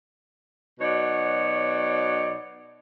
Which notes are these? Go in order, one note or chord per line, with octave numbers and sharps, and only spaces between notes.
B2 F#3 D#4 C#5 D5